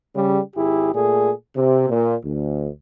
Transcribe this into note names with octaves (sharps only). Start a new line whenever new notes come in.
C#3 G3
G#1 E4 G4 G#4
A#2 A3 G#4
C3
A#2
D2